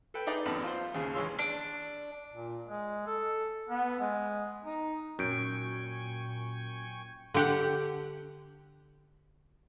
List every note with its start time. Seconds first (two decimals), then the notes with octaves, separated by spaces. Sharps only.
0.14 A4 B4 G5
0.27 D#4 G#4 B4 D5 A#5
0.46 A1 F#2 B3 A5 B5
0.64 F4 C5
0.94 D#2 C#3 G#4
1.14 A#1 E3 G#3 C#5 C6 E6
1.39 D4
2.34 A#2
2.67 G#3
3.07 A4
3.69 B3
4.00 G#3
4.65 D#4
5.19 F#2 A#2 G5 G#5 C#6 G6 D7
7.34 D3 G4 F#5